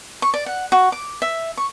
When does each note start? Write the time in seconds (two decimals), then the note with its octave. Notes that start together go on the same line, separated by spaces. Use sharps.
0.22 C#6
0.34 D5
0.46 F#5
0.72 F#4
0.92 D6
1.22 E5
1.57 C#6